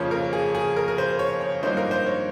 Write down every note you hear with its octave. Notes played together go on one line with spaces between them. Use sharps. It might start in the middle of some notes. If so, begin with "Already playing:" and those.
Already playing: F2 C#3 F3 A#3 C#4 C#5
A#4
G#4
G#4
A#4
A#4
C5
C#5
C#5
G#1 G2 F3 A#3 D#4 C5
A#4
C5
C#5